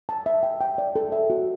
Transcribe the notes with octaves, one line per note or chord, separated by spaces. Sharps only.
A5
E5
G5
G5
D5
A4
E5
F#4